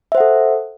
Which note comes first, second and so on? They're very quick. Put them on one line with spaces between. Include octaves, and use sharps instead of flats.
E5 C5 F#5 A4